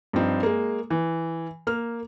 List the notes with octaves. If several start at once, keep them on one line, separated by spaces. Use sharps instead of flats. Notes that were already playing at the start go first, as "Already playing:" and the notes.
G2 F3 C4 D#4
G#3 A#3
E3
A#3 F6